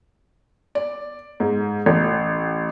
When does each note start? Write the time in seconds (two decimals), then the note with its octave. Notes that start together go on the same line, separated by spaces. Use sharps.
0.75 D5
1.40 G#2
1.86 A1